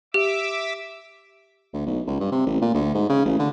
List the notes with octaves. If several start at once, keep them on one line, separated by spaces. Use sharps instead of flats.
G4 E5 D6 E6
D2
B1
C#2
G2
C3
A1
A#2
D2
G#2
C#3
A1
D3